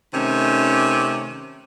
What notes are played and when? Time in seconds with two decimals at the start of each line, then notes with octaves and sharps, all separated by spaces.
0.14 C3 D#3 A3 C#4